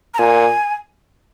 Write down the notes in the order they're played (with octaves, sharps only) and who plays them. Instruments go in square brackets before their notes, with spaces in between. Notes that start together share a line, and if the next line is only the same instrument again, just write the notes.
[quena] A#5
[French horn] A#2 [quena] G#5